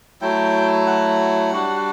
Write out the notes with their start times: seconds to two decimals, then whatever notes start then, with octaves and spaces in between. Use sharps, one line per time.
0.21 F#3 A3 E4 G5
0.86 F#5
1.51 G3 D4 F#4